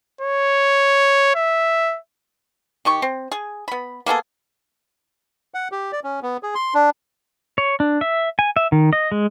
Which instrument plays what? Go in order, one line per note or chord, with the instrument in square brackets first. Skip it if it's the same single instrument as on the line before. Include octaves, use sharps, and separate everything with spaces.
[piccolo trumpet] C#5
E5
[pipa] D#3 G4 C#6
C4
G#4
B3 B5
A#3 B3 G#4 A4
[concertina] F#5
G4
D5
C#4
B3
G#4
C6
D4
[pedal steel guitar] C#5
D4
E5
G#5
E5
D#3
D#5
G#3